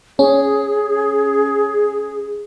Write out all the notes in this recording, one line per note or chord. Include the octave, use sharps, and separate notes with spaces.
C#4 G#4